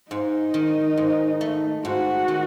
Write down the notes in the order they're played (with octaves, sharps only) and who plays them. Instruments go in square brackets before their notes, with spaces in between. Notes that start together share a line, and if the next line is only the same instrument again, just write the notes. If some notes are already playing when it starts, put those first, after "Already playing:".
[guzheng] G#2 [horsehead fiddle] D#4
[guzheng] D#3
G#2
A3
[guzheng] G#2 [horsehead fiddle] F#4
[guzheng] D#3